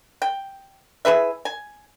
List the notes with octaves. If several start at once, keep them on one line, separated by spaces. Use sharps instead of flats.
G5
E4 G#4 B4 E5
G#5